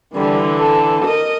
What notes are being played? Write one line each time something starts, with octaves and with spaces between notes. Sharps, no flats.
D3 E3 G3
A4
A#4 D#5